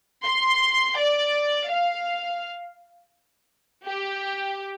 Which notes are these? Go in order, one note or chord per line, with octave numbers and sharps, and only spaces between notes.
C6
D5
F5
G4